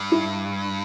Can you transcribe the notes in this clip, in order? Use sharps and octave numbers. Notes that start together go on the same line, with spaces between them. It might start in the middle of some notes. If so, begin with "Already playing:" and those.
Already playing: G2
E4